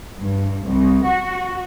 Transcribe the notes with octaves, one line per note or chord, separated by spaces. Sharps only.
G2
C2
F#4